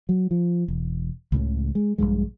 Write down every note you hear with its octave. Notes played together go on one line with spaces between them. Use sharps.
F#3
F3
E1
C#2 A2 C#3
G#3
A#1 E2 G2 G#3